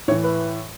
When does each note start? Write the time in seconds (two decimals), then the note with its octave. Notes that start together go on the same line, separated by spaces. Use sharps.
0.08 A2 C#5
0.11 E3
0.24 B4